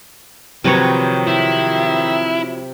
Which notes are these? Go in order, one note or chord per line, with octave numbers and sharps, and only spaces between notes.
C3 D#3 F3 F#3 B4 C#5
E4